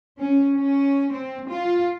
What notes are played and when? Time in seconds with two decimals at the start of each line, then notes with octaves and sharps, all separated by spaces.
0.19 C#4
0.55 C#4
1.13 C4
1.50 F4